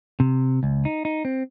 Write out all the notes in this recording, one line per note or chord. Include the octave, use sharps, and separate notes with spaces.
C3
C#2
D#4
D#4
C4